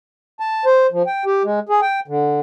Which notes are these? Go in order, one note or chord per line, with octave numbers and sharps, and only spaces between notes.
A5
C5
F3
G5
G4
G#3
G#4
G5
D3